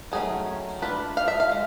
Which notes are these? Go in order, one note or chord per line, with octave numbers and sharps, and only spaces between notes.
D#3 F#3 A3 C#4 G#4
A3 D4 F4 B4
F5
E5
F5
G#3